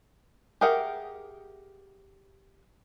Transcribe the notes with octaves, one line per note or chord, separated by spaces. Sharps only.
G4 G#4 A#4 E5 F#5